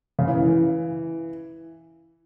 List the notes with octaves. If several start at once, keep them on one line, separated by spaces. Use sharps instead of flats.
C#3
E3